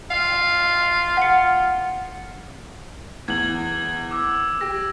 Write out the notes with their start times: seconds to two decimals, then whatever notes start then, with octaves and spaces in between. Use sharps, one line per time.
0.11 F4 F5
1.17 F#5 C#7
3.28 E2 G#6 F#7
4.11 D6 E6
4.61 G4 A#6